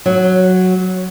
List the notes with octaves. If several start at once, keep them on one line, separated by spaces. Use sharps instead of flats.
F#3